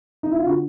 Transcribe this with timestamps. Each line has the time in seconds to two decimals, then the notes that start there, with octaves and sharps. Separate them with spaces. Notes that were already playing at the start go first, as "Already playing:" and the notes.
0.23 D#4
0.32 E4
0.39 F4
0.46 D3 F#4